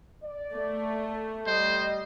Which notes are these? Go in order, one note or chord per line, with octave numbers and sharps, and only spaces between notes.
D5
A3
G3 C5 D#5